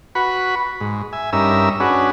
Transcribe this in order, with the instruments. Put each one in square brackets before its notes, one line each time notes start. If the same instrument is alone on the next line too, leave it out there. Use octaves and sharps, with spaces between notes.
[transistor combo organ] F#4 B4 B5 C#6
G#2
E5 G#5
G2 C#4 D#4 A#4 E5 E6
C#4 D4 F#4 G#4 B4